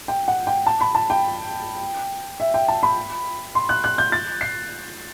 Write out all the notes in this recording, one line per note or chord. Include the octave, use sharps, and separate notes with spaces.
G5
F#5
G5
A5
B5
A5
G5
E5
G5
A5
B5
C6
F#6
F#6
G6
A6
C7